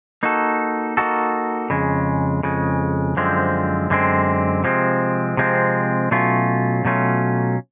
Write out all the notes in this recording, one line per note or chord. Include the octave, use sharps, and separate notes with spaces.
A#3 D#4 F#4 A4
A#3 D#4 F#4 A4
F2 C#3 G#3
F2 C#3 G#3
F#2 D3 F3 G#3 C4
F#2 D3 G#3 C4
C3 F3 G#3 C4
C3 F3 G#3 C4
B2 F#3 A3 C#4 F4
B2 F#3 A3 C#4 F4